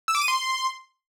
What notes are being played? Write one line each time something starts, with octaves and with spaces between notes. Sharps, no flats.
E6
D6
D#7
C6